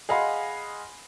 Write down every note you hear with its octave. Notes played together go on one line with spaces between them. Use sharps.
G#4 D#5 F5 F#5 B5 C6